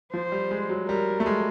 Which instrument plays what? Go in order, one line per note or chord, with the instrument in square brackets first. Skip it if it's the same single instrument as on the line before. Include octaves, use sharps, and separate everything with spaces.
[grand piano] F3 [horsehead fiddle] C5
[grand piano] G3
G#3
F#3
[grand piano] G3 [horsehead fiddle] A#4
[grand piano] A3
G#3